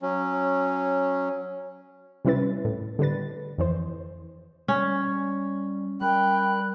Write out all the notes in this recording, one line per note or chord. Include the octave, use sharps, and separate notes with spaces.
F#3 C#4
C3 G3 C#4 E4 B4 A6
A2
D3 G3 B4 A6
F2 E3 C5
G3 C#4
G3 A#4 G5 B5 F#6